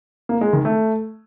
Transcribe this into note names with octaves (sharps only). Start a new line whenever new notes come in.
A#3
G#3
D#3
A3